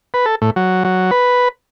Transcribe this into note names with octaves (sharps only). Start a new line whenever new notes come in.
B4
A4
A2
F#3
F#3
B4